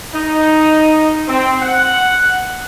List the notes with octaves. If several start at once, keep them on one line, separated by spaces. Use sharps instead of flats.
D#4
C4
F#5